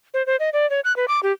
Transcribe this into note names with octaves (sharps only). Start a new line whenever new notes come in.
C5
C5
D#5
D5
C#5
F#6
B4
D6
G4